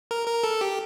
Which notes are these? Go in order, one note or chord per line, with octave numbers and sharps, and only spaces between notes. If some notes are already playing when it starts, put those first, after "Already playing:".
A#4
A#4
A4
G4